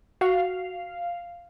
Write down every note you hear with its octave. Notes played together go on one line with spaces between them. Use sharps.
F#4 F5